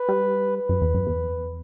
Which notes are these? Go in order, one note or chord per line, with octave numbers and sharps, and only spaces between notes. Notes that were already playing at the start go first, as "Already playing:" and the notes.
Already playing: B4
G3
B4
F#2
E2
F#2
E2